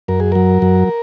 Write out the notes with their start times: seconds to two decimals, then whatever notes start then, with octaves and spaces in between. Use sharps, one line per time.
0.08 F#2 A#4
0.20 G#4
0.32 F#3 A#4
0.62 F#2